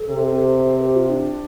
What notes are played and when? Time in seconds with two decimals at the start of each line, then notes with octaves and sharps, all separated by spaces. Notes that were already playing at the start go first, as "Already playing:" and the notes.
Already playing: A4
0.10 C3
0.67 C5
0.81 G4
0.95 F4
1.09 D4